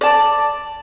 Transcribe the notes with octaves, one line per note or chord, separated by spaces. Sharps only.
D5 A5